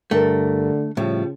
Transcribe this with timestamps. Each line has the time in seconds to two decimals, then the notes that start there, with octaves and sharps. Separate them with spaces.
0.11 G2 D3 A3 A#4
0.97 A2 C#3 F3 G3